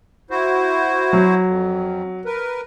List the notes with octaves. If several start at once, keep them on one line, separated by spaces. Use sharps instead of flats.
E4 F#4 C5
F#3
F2
A#4 B4